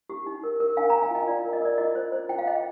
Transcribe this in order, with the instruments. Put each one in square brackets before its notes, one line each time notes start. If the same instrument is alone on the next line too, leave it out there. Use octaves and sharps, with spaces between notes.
[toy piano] G4
D#4
A#4
A#4
D4 F5 G#5
D4 G5 A#5
F5 G#5
F4 D#5 G5
F4 D5 F5
A#4
D#5
A#4 D5
F4 D#5
C5
C5
F4 G5
F5
C5 D#5 G5